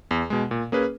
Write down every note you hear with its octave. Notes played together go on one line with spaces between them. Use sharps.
E2
B2 G#3
A#2
A#3 C#4 G#4 B4